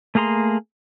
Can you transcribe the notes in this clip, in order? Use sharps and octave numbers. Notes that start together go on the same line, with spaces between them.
A3 A#3 G#4 A#5 C6